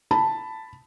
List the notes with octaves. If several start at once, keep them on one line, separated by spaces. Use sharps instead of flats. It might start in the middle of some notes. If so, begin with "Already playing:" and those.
A5 B5